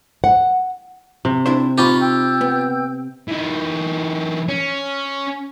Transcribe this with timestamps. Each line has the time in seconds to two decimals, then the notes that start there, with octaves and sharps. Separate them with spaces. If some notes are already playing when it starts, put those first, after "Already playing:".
0.24 F#5
1.25 C3
1.46 D4 E4 C5
1.78 C4 D#4 F4 G4 B5 C#6
2.00 G5 E6 G6
2.41 B3
3.28 E3 D#4
4.48 C#4